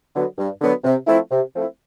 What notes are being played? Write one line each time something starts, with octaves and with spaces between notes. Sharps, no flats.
D3 F#3 B3
G2
D3 F#3 B3
C3
F3 A3 C4 E4
C3
F3 A3 C4 E4